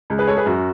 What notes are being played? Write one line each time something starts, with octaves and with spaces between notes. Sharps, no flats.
C#2
G#4 B4
G#3 A4 C#5
G#4 B4
F#2 F#4